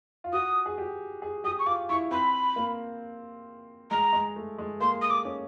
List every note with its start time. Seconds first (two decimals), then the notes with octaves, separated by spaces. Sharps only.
0.24 F4
0.33 F#4 D#6
0.66 G#4
0.78 G4
1.22 G#4
1.44 G4 D#6
1.59 C#6
1.66 F4 D6
1.89 E4 C#6
2.11 C4 B5
2.56 A#3
3.91 G#3 A#5
4.13 G#3
4.36 A3
4.58 G#3
4.80 A#3 C6
5.02 D#6
5.10 D6
5.25 C#4